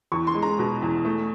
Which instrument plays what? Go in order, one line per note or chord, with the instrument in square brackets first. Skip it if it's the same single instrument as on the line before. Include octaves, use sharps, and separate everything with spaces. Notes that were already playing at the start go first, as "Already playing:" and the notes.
[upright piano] E2 C#6
C6
G#3
A#5
B2
E2
A3